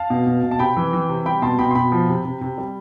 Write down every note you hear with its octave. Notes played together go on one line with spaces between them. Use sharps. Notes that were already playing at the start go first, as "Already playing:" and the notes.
Already playing: F5 A5
B2
B2
B2
A5
C3 G5 B5
E3
E3
C3
G3 G5 B5
B2 A5 C6
B2 G5 B5
C6
B2 G5 B5
F3
C3
C3
C3
G3